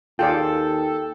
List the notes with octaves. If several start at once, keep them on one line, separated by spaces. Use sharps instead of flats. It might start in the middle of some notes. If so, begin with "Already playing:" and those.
D#2 F4 G#4 A4 D5 G5